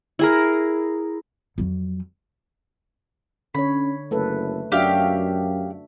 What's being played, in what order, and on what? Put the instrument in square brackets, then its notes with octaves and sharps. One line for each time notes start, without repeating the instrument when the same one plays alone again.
[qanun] E4 G#4 A#4
[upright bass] F2 F#3
[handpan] D3 C#5 [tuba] C#4 [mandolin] B5
[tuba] F#1 [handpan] A3 A4 B4
[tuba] F#2 [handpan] D4 F#4 E5 [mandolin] G4 F5